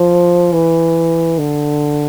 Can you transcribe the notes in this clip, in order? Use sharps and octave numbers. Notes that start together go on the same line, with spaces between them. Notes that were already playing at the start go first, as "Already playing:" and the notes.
Already playing: F3
E3
D3